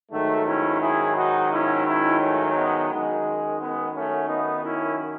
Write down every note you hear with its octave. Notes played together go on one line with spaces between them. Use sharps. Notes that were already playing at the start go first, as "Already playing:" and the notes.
G#2 D#3 F#3 A3
C#4 E4
E4 G#4
D#4 F#4
C#4 E4
C#4 E4
A3 C#4
G#3 B3
F#2 D#3 G#3
G#3 B3
A3 C#4
B3 D#4
C#4 E4